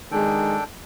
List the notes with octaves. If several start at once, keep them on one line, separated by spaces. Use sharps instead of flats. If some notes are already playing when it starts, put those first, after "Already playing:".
D#3 G#3 D4 A4 G5